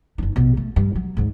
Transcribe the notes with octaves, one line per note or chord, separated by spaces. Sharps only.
F#1 D4
A#1 B2
A3
G2
F#3
D2 G#2